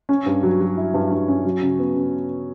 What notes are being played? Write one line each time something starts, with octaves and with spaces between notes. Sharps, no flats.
C#4
G2
F#3
F#3
E4
G2
G2
C#4
F#3
C#3
B3
C#3